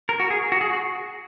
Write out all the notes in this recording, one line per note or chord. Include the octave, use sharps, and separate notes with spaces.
A#4
F#4
G#4
F#4
G#4
F#4